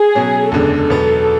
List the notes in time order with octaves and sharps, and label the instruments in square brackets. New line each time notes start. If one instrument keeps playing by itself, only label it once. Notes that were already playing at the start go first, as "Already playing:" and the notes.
Already playing: [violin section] G#4
[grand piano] B2 F#3 C#4
[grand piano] F#1 E2 D3 G#3 [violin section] A4
[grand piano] E2 B2 F#3 B3